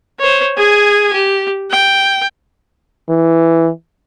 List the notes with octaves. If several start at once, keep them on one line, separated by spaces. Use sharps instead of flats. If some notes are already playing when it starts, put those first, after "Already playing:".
C5 C#5
G#4 G#5
G4
G5
E3